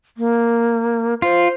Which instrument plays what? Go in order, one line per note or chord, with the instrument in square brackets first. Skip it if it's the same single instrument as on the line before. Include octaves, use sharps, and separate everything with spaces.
[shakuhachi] A#3
[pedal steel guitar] F4 [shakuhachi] C5